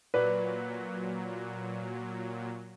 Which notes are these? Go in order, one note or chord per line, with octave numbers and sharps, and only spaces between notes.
A#2 F#3 B4 D5